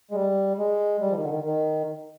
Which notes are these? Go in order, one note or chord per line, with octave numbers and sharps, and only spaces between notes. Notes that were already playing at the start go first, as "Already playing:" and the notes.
G#3
G3
G#3
G3
F3
D#3
D3
D#3
D#3